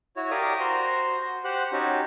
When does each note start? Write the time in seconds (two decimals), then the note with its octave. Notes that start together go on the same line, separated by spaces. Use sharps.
0.17 E4 F#4 C#5
0.31 G4 A#4 D5 F5 D#6
0.60 F#4 C5 A#5 C6
1.44 G4 C5 F#5 F#6
1.72 C#4 D#4 F#4 G4